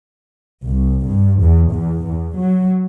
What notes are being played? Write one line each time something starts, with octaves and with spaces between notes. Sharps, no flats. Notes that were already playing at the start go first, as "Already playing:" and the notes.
C2
G2
E2
E2
E2
F#3